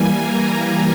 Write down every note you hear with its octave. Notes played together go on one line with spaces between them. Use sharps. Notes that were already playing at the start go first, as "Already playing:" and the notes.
Already playing: E3 G3 A#3 G#5
A#5
G#5